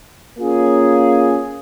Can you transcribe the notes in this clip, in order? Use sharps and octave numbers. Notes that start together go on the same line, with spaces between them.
A#3 C#4 F4 G#4